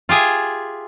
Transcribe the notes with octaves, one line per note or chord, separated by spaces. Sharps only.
F4 G4 G#4 E5